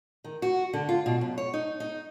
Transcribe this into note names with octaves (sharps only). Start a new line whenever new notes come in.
D#3
F#4
D3
F4
B2
F#2
C#5
D#4
D#4